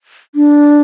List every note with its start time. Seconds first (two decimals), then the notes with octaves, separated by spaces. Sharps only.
0.35 D4